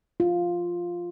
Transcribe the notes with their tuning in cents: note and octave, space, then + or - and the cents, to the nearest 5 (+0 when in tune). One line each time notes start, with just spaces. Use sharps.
F4 +0